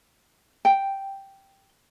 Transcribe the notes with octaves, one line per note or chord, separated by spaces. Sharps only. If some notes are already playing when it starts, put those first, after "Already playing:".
G5